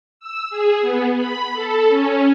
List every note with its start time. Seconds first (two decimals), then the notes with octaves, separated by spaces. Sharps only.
0.20 E6
0.50 G#4
0.81 B3
1.16 B5
1.53 A4
1.89 C#4